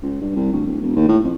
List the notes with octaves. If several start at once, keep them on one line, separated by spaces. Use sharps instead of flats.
C#2
G2
C2
D2
D1
E1
D#2
A2
F2